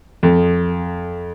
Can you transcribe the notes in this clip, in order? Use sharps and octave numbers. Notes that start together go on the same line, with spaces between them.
F2